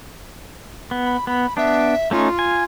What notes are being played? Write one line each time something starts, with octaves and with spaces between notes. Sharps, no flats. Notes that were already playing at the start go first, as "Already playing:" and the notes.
B3
B5
B3 B5
B3 D4 E5
A3 C#4 D#4 F4
G#5